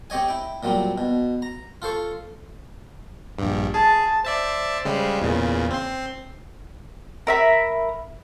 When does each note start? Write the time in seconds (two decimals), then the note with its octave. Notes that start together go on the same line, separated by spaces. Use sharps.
0.10 C4 G4 C#5 D#5 G#5
0.28 E4 G5
0.63 A#2 F#3 G3 C4
0.98 B2
1.42 A#5
1.82 F4 A4 C5 C#6
3.39 A#1 G2
3.74 G#4 A5
4.25 C5 D5 E5 A5
4.85 C#3 G3 G#3
5.22 E2 A#2 C#3
5.71 C4 C6
7.27 A#4 E5 B5